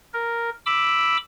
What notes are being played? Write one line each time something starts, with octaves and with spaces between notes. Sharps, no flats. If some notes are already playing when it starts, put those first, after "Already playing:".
A#4
B5 D6 E6